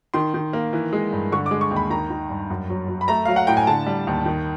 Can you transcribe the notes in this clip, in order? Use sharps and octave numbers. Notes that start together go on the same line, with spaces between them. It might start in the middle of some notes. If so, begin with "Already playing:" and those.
D#3 C6
D#3
A#3
E3
G#3
G2
D3 C#6
D6
G#3
C#6
D#2
B5
D#3 A#5
D#3
G2
F#2
F#3
F#3
B5
A3 A#5
F#3 F5
F#5
A2 G5
G#5
D3 A5
G3
D#2
D#3